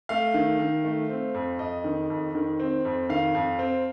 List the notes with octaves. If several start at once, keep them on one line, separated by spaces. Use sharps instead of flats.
A3 F5
D#3
D#3
A3
C4
F2
F2 D#5
D#3
F2
D#3
C4
F2
D#3 F5
F2
C4